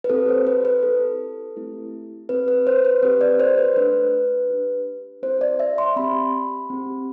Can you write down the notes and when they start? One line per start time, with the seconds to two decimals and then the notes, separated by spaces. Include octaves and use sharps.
0.04 B4
0.10 C4 G4 A4
0.29 C5
0.47 B4
0.65 B4
0.83 C4 E4 G4 A4
1.56 A3 C4 E4 G4
2.29 C4 G4 B4
2.48 B4
2.67 C5
2.85 B4
3.03 C4 G4 B4
3.21 D5
3.39 C5
3.58 B4
3.76 A3 D4 A4 B4
4.50 D4 G4
5.23 C4 E4 G4 C5
5.41 D5
5.59 E5
5.78 C6
5.96 C4 G4 B5
6.70 C4 G4